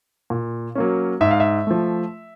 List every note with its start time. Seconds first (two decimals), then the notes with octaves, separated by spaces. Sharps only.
0.30 A#2
0.75 F#3 A#3 C#4
1.21 G#2 E5
1.31 F5
1.40 E5
1.67 F3 A3